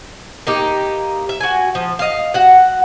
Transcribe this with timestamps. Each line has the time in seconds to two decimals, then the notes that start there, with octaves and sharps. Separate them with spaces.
0.47 A#3 D#4 G4
1.29 E5
1.41 F#4 G#5
1.75 F3
1.99 D#5 F5
2.34 F#4 F#5